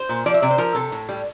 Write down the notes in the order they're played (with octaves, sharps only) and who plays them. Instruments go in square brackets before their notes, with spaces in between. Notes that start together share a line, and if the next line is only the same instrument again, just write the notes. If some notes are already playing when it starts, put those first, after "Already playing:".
Already playing: [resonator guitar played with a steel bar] C5
A#2
F3 D5
E5
C3 D5
C5
F3 A#4
C3 A4
A2
G3